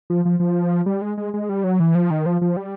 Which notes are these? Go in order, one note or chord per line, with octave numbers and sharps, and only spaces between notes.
F3
F3
F3
G3
G#3
G#3
G#3
G3
F#3
E3
F3
D#3
F3
F3
G3